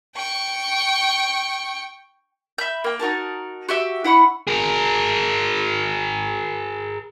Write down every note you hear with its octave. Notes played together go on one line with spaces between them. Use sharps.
G5 C#6
E5 B5 G6
A#3 G5
D#4 F#4 A#4 A5
F#4 G4 E5
E4 F#5 B5 C#6
G#4 A#4